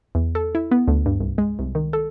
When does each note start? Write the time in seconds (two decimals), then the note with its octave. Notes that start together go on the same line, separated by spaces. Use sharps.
0.15 E2
0.35 A4
0.55 E4
0.71 B3
0.88 D2
1.06 G2
1.20 C2
1.38 G#3
1.59 C2
1.75 D#3
1.93 A4